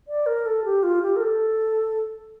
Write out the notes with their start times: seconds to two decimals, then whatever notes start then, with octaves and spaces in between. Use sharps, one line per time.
0.08 D5
0.26 A#4
0.46 A4
0.65 G4
0.83 F4
1.02 G4
1.16 A#4
1.21 A4